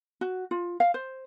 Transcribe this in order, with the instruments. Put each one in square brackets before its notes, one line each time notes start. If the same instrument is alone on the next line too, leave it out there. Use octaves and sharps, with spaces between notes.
[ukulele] F#4
F4
F5
C5